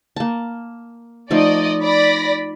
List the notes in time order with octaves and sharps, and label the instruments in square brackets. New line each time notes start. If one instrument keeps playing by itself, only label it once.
[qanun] A#3 A5
[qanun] F3 A3 D#4 [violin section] D5 D#5
[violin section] D5 B5 A#6